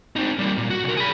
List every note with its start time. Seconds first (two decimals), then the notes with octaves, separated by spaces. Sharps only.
0.16 C4 D#4
0.39 G3 A#3
0.58 A#2
0.70 F#4
0.84 B1 A#4
0.97 G#4 B5